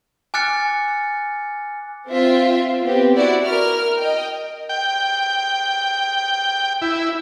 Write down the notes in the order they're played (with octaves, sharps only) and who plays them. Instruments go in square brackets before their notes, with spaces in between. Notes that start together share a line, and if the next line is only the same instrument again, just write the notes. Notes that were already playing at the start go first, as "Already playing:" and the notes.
[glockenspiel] G#5 D6 F6 F#6 A6 C#7
[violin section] C4 F4 E5
B3 C4 G4
E4 F#4 D5
A#4 F6
D#5 G5
[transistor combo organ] G5
E4